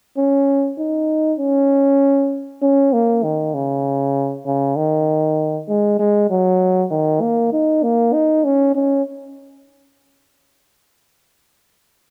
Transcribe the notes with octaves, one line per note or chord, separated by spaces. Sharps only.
C#4
D#4
C#4
C#4
A#3
D#3
C#3
C#3
D#3
G#3
G#3
F#3
D#3
A#3
D#4
A#3
D#4
C#4
C#4